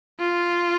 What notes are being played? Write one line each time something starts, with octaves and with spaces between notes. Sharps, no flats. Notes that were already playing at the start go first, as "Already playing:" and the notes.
F4